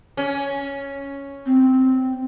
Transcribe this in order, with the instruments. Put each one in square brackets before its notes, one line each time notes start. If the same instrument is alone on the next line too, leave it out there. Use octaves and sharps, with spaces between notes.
[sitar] C#4
[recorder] C4